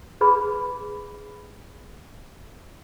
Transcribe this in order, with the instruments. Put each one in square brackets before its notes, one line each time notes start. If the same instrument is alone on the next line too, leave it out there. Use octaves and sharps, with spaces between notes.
[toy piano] G#4 B4 B5